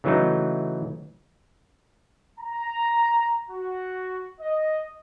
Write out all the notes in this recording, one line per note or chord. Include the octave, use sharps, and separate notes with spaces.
C#3 E3 F#3 A3 D#4
A#5
F#4
D#5